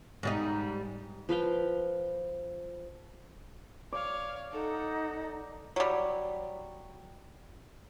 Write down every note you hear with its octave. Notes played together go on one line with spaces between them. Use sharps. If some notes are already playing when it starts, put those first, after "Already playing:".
G#2 G3 D#4
F3 B4 F5 G5
C#5 D5 F5
D#4 A4 F#5
F#3 G3